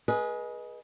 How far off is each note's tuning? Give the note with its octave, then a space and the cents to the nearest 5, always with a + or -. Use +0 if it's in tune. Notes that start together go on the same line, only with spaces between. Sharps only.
G#4 +15 B4 -30 D#5 -5